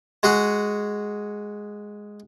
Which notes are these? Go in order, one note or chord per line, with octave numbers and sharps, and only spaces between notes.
G#3 F#4 G#4 F#5